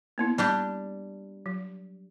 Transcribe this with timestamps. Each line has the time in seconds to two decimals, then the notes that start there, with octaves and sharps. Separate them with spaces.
0.18 A#3 B3 E4
0.38 G3 D4 G4
1.46 F#3